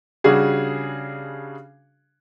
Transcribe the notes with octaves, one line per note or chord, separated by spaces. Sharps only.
C#3 G3 D4 F#4 G#4